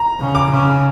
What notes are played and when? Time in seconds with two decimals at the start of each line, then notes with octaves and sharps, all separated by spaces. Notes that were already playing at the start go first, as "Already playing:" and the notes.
Already playing: A#5
0.20 C#3
0.35 D6
0.50 C#3